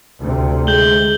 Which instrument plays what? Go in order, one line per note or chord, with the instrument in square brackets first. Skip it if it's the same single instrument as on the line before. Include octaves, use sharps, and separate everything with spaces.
[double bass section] D2 C3
[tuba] G#3 [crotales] G6 F#7 G7